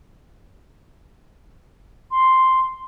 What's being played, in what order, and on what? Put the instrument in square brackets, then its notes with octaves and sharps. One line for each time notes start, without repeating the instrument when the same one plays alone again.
[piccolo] C6